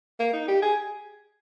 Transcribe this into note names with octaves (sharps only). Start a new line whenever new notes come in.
A#3
D#4
G4
G#4